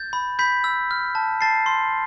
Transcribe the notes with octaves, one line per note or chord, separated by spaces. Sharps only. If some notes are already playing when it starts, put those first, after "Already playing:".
Already playing: G6 A6
B5
B5 G6 B6
E6
F6
A5
A5 A6 C7
C6